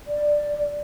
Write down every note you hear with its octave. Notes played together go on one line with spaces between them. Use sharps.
D5